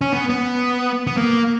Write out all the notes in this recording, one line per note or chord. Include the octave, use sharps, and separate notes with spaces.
C#4
B3
B3
B3
A#3